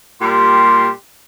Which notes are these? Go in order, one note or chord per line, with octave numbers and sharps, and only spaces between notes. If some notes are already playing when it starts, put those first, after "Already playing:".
A#2 G3 G4 C6